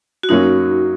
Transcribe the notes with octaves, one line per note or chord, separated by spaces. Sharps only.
F#4
F#2 F#3 A#3 C#4 D#4